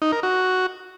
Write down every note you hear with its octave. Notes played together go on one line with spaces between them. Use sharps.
D#4
A#4
F#4